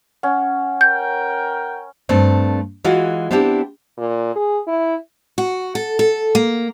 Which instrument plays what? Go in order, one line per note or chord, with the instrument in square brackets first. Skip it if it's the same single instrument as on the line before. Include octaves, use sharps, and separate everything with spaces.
[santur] C#4 [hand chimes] F#5
[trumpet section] A#4 G5 [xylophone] G6
[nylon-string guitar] G2 A3 C4
E3 G#3 F4 F#4
B3 C4 D4 E4 G4
[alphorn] A#2
G#4
E4
[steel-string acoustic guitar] F#4
A4
A4
A#3